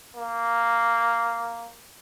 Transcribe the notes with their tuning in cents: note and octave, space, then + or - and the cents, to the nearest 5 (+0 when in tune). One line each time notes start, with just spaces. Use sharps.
A#3 -5